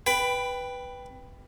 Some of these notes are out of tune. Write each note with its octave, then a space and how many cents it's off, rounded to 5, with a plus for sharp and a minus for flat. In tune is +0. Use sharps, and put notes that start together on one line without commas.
B4 +0 G5 +5 B5 +20